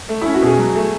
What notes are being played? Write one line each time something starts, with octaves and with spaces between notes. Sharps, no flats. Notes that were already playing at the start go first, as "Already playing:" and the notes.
A3
C#4 E4
F#4
B2 G#4
F#3
A3